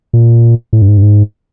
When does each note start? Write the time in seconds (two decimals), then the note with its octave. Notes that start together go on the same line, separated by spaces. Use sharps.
0.13 A#2
0.73 A2
0.82 G2
0.88 G#2
0.97 G2
1.02 G#2